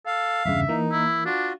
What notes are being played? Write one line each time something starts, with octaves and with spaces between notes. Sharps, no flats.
A4 F5
E2 G2 C#3 E5
E3 A#3 D#4
E4
D4 F4 F#4